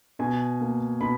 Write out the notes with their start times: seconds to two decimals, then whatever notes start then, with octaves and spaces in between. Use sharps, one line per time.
0.19 B2 G#5
0.61 A#3
1.01 B2 B5